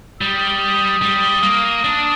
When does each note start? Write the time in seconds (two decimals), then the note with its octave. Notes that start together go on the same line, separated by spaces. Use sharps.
0.21 G3 D#6
1.02 G3
1.43 A#3
1.84 D4